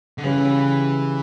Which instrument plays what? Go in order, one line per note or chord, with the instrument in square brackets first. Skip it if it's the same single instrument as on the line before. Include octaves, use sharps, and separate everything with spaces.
[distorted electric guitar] D3
[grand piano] C#3 G3 C#4 G4 [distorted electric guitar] E3